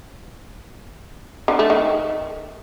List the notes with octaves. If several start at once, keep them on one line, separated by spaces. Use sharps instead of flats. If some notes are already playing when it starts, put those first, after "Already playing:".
D3
A3
D#3